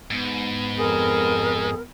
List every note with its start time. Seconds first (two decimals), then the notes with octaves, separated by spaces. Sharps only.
0.11 G#2 B3
0.78 F2 G#4 A#4